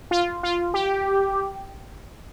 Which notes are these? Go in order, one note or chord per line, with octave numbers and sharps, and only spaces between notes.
F4
F4
G4